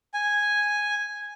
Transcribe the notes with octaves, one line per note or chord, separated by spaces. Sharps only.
G#5